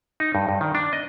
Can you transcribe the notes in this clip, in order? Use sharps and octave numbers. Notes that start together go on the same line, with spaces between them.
D#4
G2
G2
D#3
D4
D#5